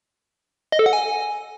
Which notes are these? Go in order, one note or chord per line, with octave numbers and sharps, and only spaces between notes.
D#5
A4
F#5
G#5